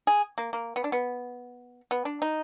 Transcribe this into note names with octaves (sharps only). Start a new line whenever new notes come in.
G#4
A#3
A#3
B3
D4
B3
B3
D4
D#4